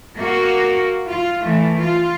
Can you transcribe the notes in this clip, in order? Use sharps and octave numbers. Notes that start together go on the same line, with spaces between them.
A#3 F#4
F4
E3 A3
F4